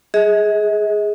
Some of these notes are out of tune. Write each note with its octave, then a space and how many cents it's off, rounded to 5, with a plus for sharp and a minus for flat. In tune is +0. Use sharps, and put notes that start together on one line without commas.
G#4 +0 D#5 +45